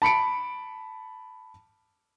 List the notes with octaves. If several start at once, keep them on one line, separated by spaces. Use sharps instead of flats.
A5 B5 C#7 D7